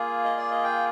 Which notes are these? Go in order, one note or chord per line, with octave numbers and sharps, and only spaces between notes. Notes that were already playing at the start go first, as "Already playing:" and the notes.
Already playing: A#3 F4 G#4
D#5
D5
D#5
G5